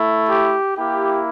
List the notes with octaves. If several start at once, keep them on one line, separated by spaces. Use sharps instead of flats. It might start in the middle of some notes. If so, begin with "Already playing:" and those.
Already playing: A3 E4
G4
A#3 E4 G4